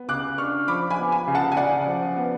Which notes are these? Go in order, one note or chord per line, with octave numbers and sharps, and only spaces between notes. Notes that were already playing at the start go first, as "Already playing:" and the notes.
Already playing: B3
C#3 D6 F#6
D4 C#6 F6
F3 B5 D6
G#5 B5
B3
G#5 B5
C#3
F#5 A5
G#5
C#3 D5 F#5
F3
B3